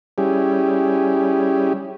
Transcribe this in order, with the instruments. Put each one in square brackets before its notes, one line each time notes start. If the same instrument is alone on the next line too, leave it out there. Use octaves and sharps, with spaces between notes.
[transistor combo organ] G3 C#4 E4 G4 G#4